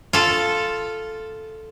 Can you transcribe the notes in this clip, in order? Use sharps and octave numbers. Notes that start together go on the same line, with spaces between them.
F4 A4